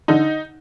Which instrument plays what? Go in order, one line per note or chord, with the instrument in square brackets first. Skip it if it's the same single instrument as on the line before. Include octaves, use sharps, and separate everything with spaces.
[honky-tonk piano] D3 D#4